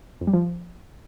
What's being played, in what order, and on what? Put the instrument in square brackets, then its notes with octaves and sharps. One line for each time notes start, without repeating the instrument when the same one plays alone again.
[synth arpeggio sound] F2
G3
F3